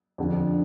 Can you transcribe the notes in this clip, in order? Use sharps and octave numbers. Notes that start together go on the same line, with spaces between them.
F2 D3 F3